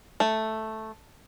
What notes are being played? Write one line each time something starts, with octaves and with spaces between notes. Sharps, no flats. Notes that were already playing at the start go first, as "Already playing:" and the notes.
A3